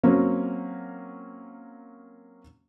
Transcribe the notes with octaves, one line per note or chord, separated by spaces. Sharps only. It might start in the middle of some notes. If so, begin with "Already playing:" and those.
F#3 A#3 C4 C#4